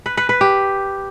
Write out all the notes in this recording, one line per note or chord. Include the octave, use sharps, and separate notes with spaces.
B4
B4
B4
G4